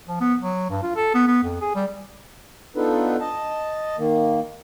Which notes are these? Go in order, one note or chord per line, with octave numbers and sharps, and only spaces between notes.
F3
B3
F#3
G2
F4
A4
B3
B3
F2
G#4
G3
B3 D4 D#4 F4 A4 B4
D#5 A5
D#3 A#3